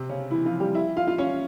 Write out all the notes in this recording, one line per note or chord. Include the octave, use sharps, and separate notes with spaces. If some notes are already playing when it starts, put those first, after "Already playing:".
Already playing: C3 C4
C#3 C#4
E3 E4
F3 F4
G3 G4
E4 E5
F4 F5
F4 F5
C#4 C#5